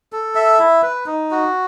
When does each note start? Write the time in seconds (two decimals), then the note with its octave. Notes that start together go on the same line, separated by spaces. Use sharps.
0.13 A4
0.35 E5
0.59 E4
0.83 B4
1.06 D#4
1.31 F#4